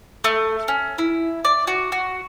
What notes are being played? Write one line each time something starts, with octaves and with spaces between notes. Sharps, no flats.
A3
C#4
E4
D5
F#4
F#4